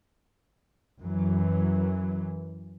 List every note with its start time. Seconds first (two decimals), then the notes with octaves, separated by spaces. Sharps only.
1.01 F#2 E3 F#3